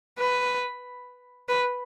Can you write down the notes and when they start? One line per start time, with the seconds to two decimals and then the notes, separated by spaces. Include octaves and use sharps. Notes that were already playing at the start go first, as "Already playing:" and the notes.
0.18 B4
1.49 B4